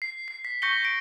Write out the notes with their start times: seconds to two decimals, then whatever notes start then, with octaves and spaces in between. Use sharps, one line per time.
0.02 C7
0.28 C7
0.45 B6
0.62 C#6 G6 A#6 B6 C#7 G7
0.84 A#6 D7